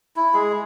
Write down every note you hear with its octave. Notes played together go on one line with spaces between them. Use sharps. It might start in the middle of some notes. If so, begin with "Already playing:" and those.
E4
G#3 G#4